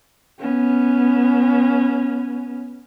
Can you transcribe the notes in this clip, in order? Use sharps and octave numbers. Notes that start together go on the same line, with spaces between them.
B3 C#4